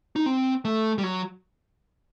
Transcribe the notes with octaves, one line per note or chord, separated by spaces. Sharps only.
D#4
C4
A3
G3
F#3